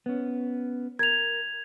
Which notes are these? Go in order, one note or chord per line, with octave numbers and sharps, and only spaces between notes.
B3 C#4
A#4 G#6 F7